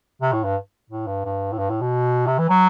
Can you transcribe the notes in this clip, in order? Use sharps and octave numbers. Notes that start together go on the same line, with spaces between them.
C3
A2
G2
A2
G2
G2
A2
G2
A2
B2
C3
E3
F#3